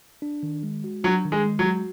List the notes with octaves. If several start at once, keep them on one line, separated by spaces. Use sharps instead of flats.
D4
D#3
G#3
F#4
F#3 D4
D#3
G#3
G#3
F#3
F#4